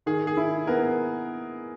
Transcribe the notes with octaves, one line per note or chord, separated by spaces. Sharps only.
D#3 G#4
G#4
E4
B3 A#4